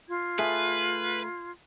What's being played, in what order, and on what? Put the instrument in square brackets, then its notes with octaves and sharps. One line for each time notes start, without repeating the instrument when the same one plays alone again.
[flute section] F4 G#6
[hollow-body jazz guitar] A3 G#4 [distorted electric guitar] B4